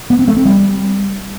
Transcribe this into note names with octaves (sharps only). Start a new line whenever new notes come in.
B3
C4
A3
C4
G3